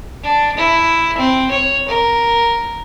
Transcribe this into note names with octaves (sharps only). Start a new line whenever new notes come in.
D4
E4
C4
C#5
A#4